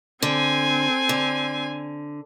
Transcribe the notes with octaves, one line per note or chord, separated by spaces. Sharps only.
D3 C4 G#5
D3